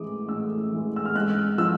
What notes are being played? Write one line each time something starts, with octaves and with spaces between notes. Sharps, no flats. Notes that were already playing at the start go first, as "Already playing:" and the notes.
Already playing: A2 E3 G#3 D6 D#6
A2 E6
E3 G#3
E6
F6
G#2 F#6
F3 E6